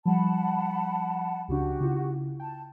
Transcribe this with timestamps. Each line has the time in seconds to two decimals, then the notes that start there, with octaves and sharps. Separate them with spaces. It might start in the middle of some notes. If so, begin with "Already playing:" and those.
0.06 F3 G3 F#5 A5 B5
1.48 C#2 C#3 D4 F#4 G4
1.80 C#3 E4 F4
2.40 G5 A5